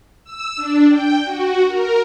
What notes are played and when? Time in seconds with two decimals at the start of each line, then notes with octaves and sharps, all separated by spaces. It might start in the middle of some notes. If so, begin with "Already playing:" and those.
0.24 E6
0.56 D4
0.88 G5
1.25 F#4
1.67 A#4